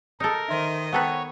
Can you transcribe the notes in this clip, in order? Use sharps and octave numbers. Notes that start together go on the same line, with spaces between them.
D#4 A4 A#4
D#3 C5 D#5 E5 C6
B3 A4 B4 C#5 F#5 G5 A#5